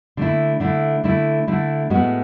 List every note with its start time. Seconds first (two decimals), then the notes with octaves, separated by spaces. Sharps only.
0.17 D3 A3 E4
0.60 D3 A3 E4
1.04 D3 A3 E4
1.47 D3 A3 E4
1.90 A2 G#3 B3 F#4